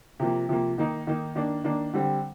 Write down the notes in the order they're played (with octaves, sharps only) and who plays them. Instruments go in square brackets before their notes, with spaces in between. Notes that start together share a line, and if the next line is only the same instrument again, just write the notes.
[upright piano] C3 F3 A#3
C3 F3 A#3
D#3 A#3 D#4
D#3 A#3 D#4
D#3 A#3 D4
D#3 A#3 D4
D3 G3 C4